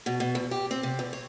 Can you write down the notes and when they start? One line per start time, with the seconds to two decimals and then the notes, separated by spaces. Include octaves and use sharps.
0.06 B2
0.20 B2
0.35 E2
0.51 G4
0.71 C4
0.83 C3
0.99 E2
1.13 C#5